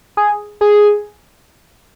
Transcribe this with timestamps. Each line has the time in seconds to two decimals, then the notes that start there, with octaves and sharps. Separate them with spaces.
0.17 G#4
0.61 G#4